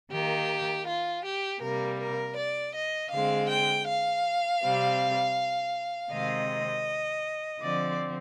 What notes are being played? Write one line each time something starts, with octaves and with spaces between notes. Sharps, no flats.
D#3 A#3 G4
F4
G4
C3 G3 A#3 A#4
A#4
D5
D#5
D3 G#3 C4 F5
G5
F5
C3 G3 C4
C3 D#3 G#3 C4 D#5
D3 F3 C4 D5